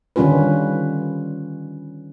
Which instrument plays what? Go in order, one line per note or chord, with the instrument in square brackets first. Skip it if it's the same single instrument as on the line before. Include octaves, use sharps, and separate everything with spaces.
[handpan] D3 D#3 G3 C#4 F4 B4